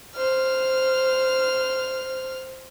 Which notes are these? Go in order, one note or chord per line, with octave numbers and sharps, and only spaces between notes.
C5 F6